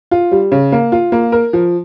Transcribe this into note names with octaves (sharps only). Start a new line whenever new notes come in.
F4
G3
C#3
A#3
F4
A#3
A#4
F3